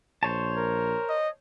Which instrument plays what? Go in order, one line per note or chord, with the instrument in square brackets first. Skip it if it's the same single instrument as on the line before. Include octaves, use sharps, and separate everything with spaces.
[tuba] A#1 [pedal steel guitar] C5 C#5 A5
[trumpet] A#4
[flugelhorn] D#5